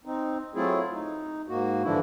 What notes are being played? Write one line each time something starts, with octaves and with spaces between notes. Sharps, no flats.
C4 D#4
F#3 A3 C4 E4 F4 G#4
D#4
G#2 A#3 F#4
G2 D3 E3 F3 D4 E4